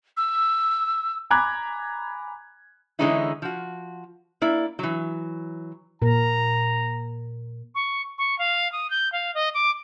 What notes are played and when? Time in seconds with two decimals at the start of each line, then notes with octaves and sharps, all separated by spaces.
0.17 E6
1.30 G#5 A#5 B5 D6 F#6 G#6
2.99 D3 E3 G#3 C#4 D#4 E4
3.42 F3 F#4
4.42 A#3 E4 D5
4.79 E3 F#3
6.02 A#2 A#4 A#5
7.75 C#6
8.18 C#6
8.39 F5
8.72 D#6
8.90 G6
9.12 F5
9.35 D#5
9.54 D6